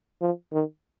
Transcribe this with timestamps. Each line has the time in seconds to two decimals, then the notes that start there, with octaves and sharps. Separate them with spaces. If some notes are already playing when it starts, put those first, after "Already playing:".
0.21 F3
0.53 D#3